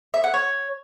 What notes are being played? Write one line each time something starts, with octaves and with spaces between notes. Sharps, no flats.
E5
F#5
C#5